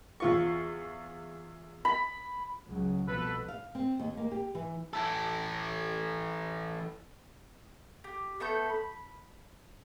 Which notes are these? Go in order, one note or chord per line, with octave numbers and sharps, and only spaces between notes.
E2 F4 C#6
B5
C#2 C#3 F#3
C2 B2 F3 A4 B4
F5
C4
D#2
A#3
G4
E3
E3 A4
G4
A3 B3 A4 G6
B5